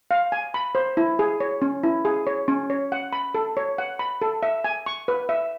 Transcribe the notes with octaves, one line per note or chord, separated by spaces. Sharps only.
F5
G#5
B5
C5
E4
G#4
C#5
C#4
E4
G#4
C#5
C#4
C#5
F#5
B5
A4
C#5
F#5
B5
A4
E5
G#5
C#6
B4
E5